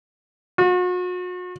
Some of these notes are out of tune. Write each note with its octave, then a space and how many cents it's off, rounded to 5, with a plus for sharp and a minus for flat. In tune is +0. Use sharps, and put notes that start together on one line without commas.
F#4 -40